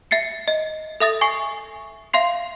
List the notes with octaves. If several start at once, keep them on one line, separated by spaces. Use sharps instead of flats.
E5 A6 C7 C#7
D#5
A4 E5 D#6 A6
G#5 C#6 C7
E5 F5 C6 C7